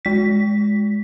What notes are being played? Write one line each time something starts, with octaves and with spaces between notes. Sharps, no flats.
G#3 B6